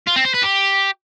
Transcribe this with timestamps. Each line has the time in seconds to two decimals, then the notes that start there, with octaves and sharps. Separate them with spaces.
0.07 F4
0.16 C4
0.25 C5
0.34 B4
0.43 G4